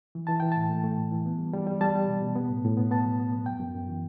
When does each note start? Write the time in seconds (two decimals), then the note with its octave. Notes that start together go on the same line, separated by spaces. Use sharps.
0.15 E3
0.27 E3 A5
0.40 E3 G5
0.52 A2 A5
0.70 A3
0.84 A3
0.98 A2
1.12 E3
1.26 B3
1.39 G3
1.53 G3
1.67 G3
1.81 G3 A5
1.95 G3
2.08 B2
2.22 B2
2.36 B3
2.50 A2
2.64 A2
2.77 B3
2.91 B3 A5
3.05 F#3
3.20 B3
3.32 B3
3.46 F#2 G5
3.60 F#2
3.74 F#2
3.88 E3